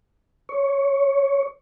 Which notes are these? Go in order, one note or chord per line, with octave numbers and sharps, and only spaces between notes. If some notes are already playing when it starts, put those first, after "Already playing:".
C#5